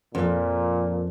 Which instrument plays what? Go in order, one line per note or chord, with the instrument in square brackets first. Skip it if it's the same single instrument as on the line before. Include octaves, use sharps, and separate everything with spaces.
[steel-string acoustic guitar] F2 [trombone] A#2